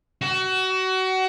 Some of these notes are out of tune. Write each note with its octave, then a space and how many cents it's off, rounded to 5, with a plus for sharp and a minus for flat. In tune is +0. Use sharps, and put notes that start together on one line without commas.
F#4 +25